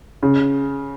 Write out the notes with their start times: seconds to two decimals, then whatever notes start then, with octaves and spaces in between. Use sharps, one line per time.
0.23 C#3